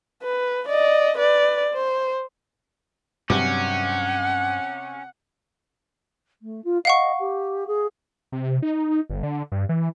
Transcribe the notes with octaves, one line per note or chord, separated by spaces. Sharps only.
B4
D5 D#5
B4 D5
C5
G2 C3 F#3 C#4 F#5
A3
F4
D#5 F5 F#5 C#6
G4
G#4
C3
D#4
G1
D3
G2
E3